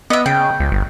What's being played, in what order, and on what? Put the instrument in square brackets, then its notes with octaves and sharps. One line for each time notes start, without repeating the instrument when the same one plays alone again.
[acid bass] B3 [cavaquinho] D#5 E5
[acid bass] C#3 [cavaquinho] G5
[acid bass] C#2
G1